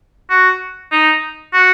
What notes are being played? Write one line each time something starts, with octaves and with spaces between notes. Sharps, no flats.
F#4
D#4
F#4